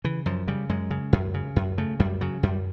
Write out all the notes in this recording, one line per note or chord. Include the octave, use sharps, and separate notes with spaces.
C#3 E3
F#2 F3
C#3 G3
F#2 G#3
C#3
F#2
C#3
F#2
C#3 A3
F#2 G3
C#3 F#3
F#2 G3